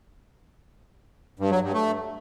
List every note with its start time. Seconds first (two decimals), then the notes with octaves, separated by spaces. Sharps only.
1.40 G2
1.51 F#3
1.62 G2
1.74 A3